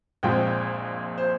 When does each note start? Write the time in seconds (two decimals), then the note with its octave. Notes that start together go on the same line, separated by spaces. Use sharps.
0.23 A#1 A#2 G#3 C4 G5
1.18 C5